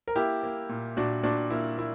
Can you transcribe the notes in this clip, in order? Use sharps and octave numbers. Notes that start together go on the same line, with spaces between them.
A#4
A#3 E4 G4
A#3
A#2
A#2 D4 F#4
A#2 D4 F#4
A#3 E4
A#3 E4